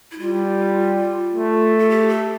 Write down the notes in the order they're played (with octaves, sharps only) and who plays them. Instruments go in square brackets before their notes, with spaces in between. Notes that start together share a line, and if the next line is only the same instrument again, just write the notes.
[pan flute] E4
[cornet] G3 [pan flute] F4
[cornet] A3
[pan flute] A4
G4
A4